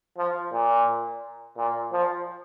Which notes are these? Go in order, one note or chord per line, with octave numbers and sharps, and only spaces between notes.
F3
A#2
A#2
F3